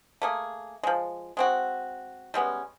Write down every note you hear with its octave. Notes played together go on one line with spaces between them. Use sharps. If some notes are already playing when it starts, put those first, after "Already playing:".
A3 A#3 G#4
F3 G#3
G#3 C4 F#4
G3 G#3 B3 C#4